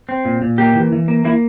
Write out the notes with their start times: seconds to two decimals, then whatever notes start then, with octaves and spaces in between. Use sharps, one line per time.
0.09 C4
0.25 A#2
0.42 A#2
0.58 A#3 G4
0.75 E3
0.92 E3
1.08 A#3
1.25 A#3 E4